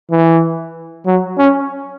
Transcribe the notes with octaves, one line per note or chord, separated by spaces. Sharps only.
E3
F#3
C#4